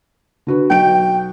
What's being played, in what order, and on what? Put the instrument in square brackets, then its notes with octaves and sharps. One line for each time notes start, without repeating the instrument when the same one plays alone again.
[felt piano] D3 F#4 B4
[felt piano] B1 F#4 D7 [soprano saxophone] G5